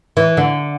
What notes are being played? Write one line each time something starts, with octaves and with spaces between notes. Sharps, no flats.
E3
D3